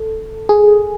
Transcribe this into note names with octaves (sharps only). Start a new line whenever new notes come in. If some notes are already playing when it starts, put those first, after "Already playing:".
Already playing: A4
G#4